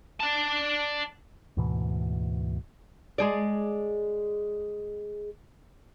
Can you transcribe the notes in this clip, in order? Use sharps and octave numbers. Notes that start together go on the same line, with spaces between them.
D5 A5
D2 G#2 B2 E3
G#3 G#4 D5